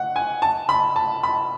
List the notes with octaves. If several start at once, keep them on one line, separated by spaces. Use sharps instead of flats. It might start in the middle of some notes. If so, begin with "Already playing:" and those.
Already playing: F#5
G#5
A5
B5
A5
B5